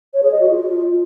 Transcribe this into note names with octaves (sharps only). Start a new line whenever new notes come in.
C#5
G#4
D#5
F#4
F4